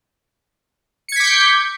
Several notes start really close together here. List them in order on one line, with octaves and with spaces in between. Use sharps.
C#7 G#6 B6 D6 G6